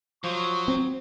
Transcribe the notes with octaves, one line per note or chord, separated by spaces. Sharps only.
F3 F#3 C#6
C4